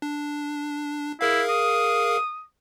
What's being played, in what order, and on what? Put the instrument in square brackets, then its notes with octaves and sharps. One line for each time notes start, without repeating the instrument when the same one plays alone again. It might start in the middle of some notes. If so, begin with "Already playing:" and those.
[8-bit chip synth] D4
[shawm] E4 [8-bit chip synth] G#4 A#4 F5
[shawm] D#6